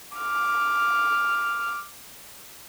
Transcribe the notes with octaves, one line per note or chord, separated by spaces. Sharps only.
D6 F6